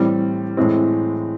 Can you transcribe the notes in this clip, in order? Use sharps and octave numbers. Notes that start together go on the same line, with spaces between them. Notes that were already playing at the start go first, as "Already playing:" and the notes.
Already playing: A2 E3 G3 C4
A2 E3 G#3 C4